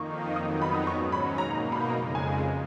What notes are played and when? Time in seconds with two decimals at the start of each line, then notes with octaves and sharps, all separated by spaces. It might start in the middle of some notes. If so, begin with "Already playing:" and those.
Already playing: F2 D#3 A#3 D#4 C#6
0.35 F2 D#3 F#3 B3 D#4 D#6
0.62 B5
0.74 D#6
0.87 G#2 F#3 C#4 C#6
1.12 B5
1.38 B2 A#3 D#4 A#5
1.55 A#5
1.72 B5
1.89 F2 C#3 G#3 A#5
2.15 G#5